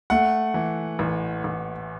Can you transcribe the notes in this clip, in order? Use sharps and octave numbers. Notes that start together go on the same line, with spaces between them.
A3 F#5
E3
A1
A1